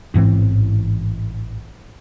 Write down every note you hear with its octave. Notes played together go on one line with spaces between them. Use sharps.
A1 G#2 E3 C4